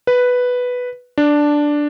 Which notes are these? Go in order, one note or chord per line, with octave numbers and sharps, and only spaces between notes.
B4
D4